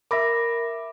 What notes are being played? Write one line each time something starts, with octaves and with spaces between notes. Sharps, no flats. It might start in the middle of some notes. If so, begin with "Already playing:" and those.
A#4 E5 B5 D6 A#6